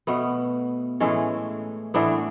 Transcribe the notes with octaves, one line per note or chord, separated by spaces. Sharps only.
B2 A3 B3
A2 E3 G#3 A3 C#4
A2 E3 A3 B3 D4